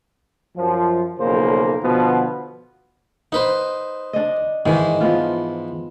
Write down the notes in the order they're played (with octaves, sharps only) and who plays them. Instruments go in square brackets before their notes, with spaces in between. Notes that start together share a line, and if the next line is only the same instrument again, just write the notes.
[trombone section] F#2 F3
B1 F2 C#3 A#3 C5
B2 D3 F3 B3
[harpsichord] D#4 B4 C5 [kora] F#5
[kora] D4 D#5
[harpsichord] G#2 E3 [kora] D#3 G#3
[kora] F3 B3 F4